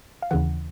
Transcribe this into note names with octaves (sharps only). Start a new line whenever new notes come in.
F5
D#2 C#3 E3 F#5